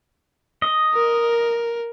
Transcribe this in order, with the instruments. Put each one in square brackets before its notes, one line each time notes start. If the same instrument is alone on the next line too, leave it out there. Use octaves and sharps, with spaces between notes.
[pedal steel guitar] D#5
[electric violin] A#4